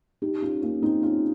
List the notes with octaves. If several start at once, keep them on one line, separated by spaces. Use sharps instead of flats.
D#4 G4
C#4 F4
A#3 C#4
C4 D#4
C#4 F4